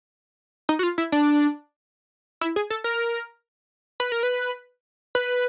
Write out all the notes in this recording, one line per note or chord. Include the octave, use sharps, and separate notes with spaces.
D#4
F#4
F4
E4
D4
E4
G#4
A4
A#4
B4
A#4
B4
B4